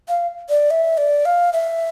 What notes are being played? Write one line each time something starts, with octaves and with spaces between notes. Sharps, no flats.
F5
D5
E5
D5
F5
E5